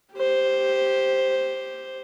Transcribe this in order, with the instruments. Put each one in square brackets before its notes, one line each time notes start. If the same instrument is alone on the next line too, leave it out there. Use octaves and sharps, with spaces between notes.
[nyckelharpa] G4 C5